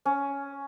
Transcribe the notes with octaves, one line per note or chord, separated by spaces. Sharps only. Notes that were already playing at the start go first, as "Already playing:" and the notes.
C#4